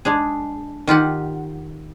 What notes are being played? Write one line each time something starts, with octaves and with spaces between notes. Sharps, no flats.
G#3 D4 G#4
D#3 F4 G4 F#5